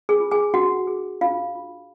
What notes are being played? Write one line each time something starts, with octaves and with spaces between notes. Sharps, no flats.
G#4 G#5
F4
G#4 G#5
D4 F#4 F#5
G#4
D4 F4 F5
F4